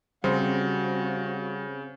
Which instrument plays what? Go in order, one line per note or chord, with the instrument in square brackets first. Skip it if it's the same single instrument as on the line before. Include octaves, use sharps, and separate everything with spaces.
[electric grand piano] C#3 [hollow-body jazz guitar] G3 [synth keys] C4 [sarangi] F#4